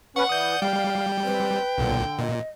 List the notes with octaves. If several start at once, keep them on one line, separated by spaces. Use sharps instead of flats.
C#4 B4 F#5 C#6
E3 D5 D#6 G6
G3 F5 G5
C4 B4
B1 A#2 D3
A#2 D#5